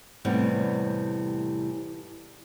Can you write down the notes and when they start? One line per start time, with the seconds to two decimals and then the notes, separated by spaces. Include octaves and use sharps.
0.25 E2 A2 C3 G3 B3